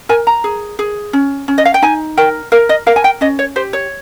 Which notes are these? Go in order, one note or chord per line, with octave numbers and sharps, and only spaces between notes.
A#4 G#5
A#5
G#4
G#4
C#4
C#4
D#5
F5
G5
D#4 G#5
A#4 G5
A#4 F5
D#5
A#4 F5
G#5
G5
C#4 D#5
C#5
G4 C5
C#5